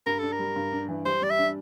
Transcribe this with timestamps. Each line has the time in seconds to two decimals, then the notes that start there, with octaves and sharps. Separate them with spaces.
0.06 G2 A#4
0.19 D4 A4
0.32 A#4
0.39 G3
0.56 G2
0.72 D4
0.88 E3
1.05 G3 C5
1.22 G3 D5
1.30 E5
1.38 D4